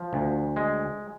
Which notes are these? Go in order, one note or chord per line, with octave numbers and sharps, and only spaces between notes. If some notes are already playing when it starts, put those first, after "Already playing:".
Already playing: F3
D2
G#3